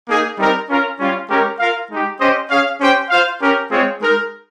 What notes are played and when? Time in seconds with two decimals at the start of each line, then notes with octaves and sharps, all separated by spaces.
0.08 A#3 D#4 G#4
0.39 G3 C4 D#4 A#4
0.69 C#4 F4 A#4
0.99 G3 C#4 F4
1.29 G#3 C#4 G4 A#4
1.60 F4 A#4 F5
1.90 G#3 D#4 G4
2.20 C#4 G4 C5 D#5
2.50 C#4 G#4 C#5 F5
2.80 C#4 G4 C5 G5
3.10 F4 C5 F5
3.41 C#4 G4 A#4
3.71 G#3 C4 F4 G#4 C#5
4.01 G#3 D#4 A#4